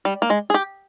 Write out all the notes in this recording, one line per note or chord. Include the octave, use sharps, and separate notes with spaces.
G3
A#3
G#3
G#4
G4